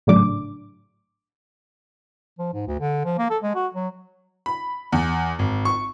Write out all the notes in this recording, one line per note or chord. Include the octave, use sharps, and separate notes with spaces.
G#1 A2 C#3 F#3 D4 D6
F3
G#2
D2
D3
F3
A#3
A4
G#3
F#4
F#3
B5
E2
G#1
C#6